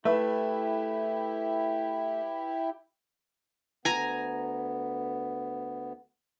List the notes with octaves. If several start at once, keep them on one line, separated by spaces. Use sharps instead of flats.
A3 E4 G4 B4 E5
D2 B3 G#5 A#5